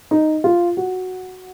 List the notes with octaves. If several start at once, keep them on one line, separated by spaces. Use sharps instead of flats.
D#4
F4
F#4